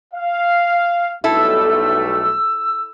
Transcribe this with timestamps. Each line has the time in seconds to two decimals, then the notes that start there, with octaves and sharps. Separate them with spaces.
0.14 F5
1.24 B1 G3 A3 E4 A4 E6